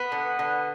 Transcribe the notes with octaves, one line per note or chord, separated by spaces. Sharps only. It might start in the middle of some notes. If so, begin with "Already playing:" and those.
Already playing: B3
D3
D3